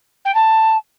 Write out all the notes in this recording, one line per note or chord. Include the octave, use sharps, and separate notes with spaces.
G5
A5